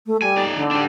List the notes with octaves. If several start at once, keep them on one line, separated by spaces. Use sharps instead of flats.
A3
G3 G#5
D#4 D5
D3
D4 G4